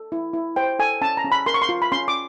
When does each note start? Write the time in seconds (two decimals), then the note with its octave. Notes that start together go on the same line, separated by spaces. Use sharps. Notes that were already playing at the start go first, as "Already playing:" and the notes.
Already playing: A4
0.12 E4
0.33 E4
0.56 C5 G5
0.79 A4 G#5
1.01 C#4 A5
1.17 A#5
1.25 C#4
1.32 B5
1.46 A#4 C6
1.54 C#6
1.62 C6
1.69 F4
1.82 B5
1.92 C#4 C6
2.08 D6